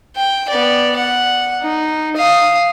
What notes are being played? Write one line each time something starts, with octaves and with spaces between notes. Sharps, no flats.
G5
B3 D5
F#5
D#4
F5 D#6